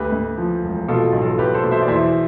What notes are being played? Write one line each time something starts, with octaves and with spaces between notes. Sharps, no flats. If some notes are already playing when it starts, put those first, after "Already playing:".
Already playing: D2 G4 B4
D2
F3
E1
B2 F4 A4
B1
F4 A4
B1 G4 B4
A4 C5
B2
C5 E5
D5
E2 C5 E5